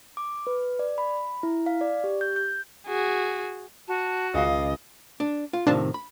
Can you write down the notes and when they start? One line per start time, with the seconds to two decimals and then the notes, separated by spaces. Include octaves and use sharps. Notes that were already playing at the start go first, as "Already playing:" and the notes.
0.17 D6
0.47 B4
0.79 D5
0.98 B5
1.43 E4
1.66 F5
1.81 D5
2.04 G4
2.21 G6
2.36 G6
2.87 F#4 G#4
3.88 F#4 A5
4.34 C#2 D#5 F5
5.20 D4
5.53 F4
5.67 A2 C3 D#3 D4 F4 A5
5.94 B5